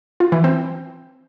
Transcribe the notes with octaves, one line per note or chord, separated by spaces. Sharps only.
F4
E3
C4